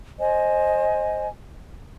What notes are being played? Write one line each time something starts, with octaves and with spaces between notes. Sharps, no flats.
C5 D#5 G#5